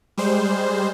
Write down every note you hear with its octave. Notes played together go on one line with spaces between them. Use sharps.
G3 G#3 C5